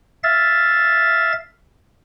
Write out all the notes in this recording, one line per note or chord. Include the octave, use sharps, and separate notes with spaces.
E5 F5 A6